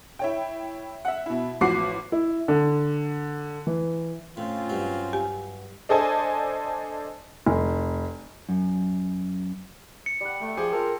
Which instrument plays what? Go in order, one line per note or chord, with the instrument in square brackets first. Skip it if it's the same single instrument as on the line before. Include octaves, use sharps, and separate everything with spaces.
[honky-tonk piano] E4 C#5 G5
E5 F#5
B2 E4
A1 F3 F#4 F#5 D6 C7
[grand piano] E4
D3
E3
[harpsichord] A2 [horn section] C4 C#4 F4
[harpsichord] G2 F#3
[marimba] G4 G#5
[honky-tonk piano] D4 A4 C5 D#5 G#5 A5
[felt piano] F1
[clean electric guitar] F#2
[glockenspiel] C#7
[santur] G3 F#5
[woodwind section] A3 [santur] G5
[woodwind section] F3 G4 [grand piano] G#4 [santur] C5
[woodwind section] A#3 F4 A#4 [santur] A4